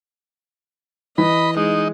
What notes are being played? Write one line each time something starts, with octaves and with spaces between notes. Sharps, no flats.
E3 D#5 B5
G#3 D#4